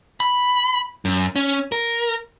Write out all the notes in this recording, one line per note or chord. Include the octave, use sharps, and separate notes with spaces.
B5
F#2
C#4
A#4